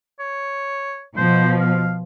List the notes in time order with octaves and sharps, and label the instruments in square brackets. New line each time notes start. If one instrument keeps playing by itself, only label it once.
[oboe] C#5
[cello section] B2 F3 [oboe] C5
[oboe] F5